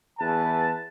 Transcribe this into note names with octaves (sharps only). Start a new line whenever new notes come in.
E2 B4 A5